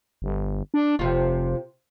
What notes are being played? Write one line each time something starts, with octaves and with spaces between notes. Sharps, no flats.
G1
D4
F1 C3 F4